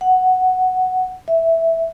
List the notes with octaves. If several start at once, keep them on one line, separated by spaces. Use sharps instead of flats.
F#5
E5